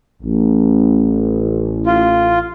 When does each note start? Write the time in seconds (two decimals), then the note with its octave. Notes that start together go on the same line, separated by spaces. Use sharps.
0.23 A1
1.86 F4